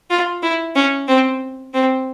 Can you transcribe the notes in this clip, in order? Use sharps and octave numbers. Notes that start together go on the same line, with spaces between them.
F4
E4
C#4
C4
C4